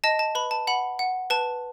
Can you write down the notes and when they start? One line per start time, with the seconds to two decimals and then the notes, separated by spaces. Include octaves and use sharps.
0.04 D#5 A5
0.19 A5
0.35 B4 B5
0.51 A5
0.67 F#5 B5
0.99 F#5
1.30 B4 A5